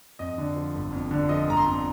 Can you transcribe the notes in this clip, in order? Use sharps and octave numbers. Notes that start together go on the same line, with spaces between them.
F2 D#5
D3
F3
G1
F2
D3
F3 D#5
G1 A#5
C6
F2